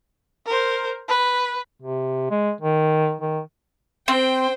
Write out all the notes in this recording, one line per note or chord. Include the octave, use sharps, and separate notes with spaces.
A#4 C5
B4
C3
G#3
D#3
D#3
C4 C5 G5